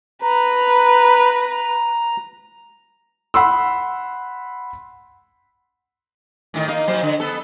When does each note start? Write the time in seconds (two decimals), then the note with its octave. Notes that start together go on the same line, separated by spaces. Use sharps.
0.22 B4 A#5
3.34 F#5 B5 C6 E6
6.54 A2 D#3
6.68 A#3 D#4
6.87 A#2 F#3 C5
7.03 D3
7.20 B3 A4